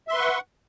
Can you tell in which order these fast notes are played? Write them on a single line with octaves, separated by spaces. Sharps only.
E5 C6 B4 C#6 F#5